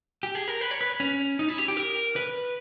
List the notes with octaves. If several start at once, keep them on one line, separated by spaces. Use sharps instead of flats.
G4
G#4
A#4
B4
C#5
B4
C#4
D#4
E4
G4
G4
A#4
B4